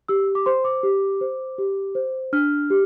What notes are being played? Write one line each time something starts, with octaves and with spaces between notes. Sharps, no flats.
G4 E6
D6
C5 C6
D6
G4
C5
G4
C5
D4 F6
G4